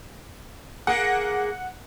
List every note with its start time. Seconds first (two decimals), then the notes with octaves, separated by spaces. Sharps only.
0.87 A#3 G#4 F#5